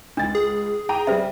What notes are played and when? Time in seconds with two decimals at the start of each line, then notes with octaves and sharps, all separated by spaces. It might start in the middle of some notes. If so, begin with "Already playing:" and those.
0.17 C#2 D4 A6
0.35 G#4
0.89 G5 A#5 D#7
1.07 C#3 G3 C5 E5